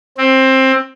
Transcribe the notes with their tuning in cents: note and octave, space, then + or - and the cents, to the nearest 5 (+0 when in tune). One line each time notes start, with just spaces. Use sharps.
C4 +15